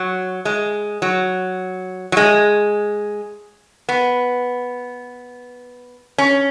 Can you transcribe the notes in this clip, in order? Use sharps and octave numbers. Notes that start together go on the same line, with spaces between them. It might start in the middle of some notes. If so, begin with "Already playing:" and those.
Already playing: F#3
G#3
F#3
F#3
G#3
B3
C#4